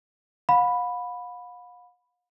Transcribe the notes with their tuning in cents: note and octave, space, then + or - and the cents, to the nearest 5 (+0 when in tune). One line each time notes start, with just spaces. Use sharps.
F5 +45 B5 +0